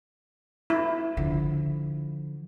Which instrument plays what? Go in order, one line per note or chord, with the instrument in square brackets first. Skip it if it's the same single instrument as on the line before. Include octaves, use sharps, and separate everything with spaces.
[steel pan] E4
[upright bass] D3 F3